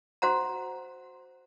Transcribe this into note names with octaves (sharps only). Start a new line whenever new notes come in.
F#4 C5 F#5 A#5